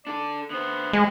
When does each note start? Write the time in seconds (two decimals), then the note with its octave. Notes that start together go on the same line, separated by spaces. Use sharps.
0.07 D4 A4 D5
0.51 D3 B3 C5
0.93 F#3 G#3 D#5